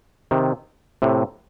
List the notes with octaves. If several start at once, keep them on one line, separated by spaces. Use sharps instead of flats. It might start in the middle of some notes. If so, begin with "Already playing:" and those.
C3 D#3
A2 C3